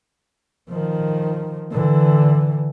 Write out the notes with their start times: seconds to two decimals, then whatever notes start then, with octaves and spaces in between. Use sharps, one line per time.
0.69 D#3 F3
1.72 D3 E3